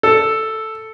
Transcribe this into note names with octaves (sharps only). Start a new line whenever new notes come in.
A4